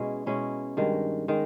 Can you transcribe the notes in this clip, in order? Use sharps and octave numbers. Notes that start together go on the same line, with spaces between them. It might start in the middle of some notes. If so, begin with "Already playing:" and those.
Already playing: B2 G#3 C#4 E4
B2 G#3 C#4 E4
G2 D#3 G#3
D#3 G#3